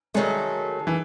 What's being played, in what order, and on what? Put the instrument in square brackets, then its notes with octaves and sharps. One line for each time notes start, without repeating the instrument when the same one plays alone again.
[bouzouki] D#3 F#3 A3 [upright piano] G#3
[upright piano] E3